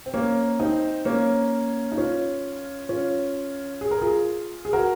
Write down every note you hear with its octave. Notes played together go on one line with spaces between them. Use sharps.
C4
A#3 C#4
C4 D#4
A#3 C#4
D#4
C#4 F4
C#4 F4
G#4
A#4
F4 G#4
G#4
F#4 A#4